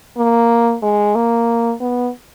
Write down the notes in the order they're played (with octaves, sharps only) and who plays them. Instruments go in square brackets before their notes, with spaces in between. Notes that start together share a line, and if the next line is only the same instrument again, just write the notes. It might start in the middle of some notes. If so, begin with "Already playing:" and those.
[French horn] A#3
G#3
A#3
B3